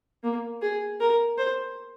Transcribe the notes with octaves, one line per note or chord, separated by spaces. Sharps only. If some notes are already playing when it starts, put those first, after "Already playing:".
A#3
G#4
A#4
C5